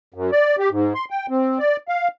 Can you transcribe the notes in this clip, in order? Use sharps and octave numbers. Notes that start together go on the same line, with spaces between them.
F#2
D5
G4
G#2
C6
G5
C4
D5
F5